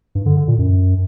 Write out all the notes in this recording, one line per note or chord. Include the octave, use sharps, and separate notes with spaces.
G2
D3
D3
A#2
F#2